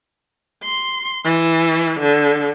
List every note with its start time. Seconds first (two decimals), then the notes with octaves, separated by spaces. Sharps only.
0.63 C6
1.24 E3
2.00 D3